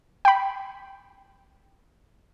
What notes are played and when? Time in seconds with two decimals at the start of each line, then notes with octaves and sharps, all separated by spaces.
0.25 G5 B5